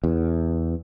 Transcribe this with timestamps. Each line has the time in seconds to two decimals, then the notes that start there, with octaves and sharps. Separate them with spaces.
0.04 E2